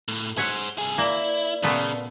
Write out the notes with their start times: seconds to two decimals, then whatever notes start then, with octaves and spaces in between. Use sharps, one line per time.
0.08 A2
0.37 G#4 C5 C#5 E5 F#5
0.78 C2 G#4 G#5
0.98 A#3 E4 D5
1.63 A#2 C#3 A3 B3